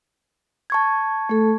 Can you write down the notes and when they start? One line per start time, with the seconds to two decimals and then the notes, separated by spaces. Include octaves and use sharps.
0.70 A5 C#6 G#6
1.29 A3 A4